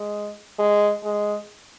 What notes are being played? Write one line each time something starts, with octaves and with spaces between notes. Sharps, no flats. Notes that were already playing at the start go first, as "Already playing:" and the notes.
Already playing: G#3
G#3
G#3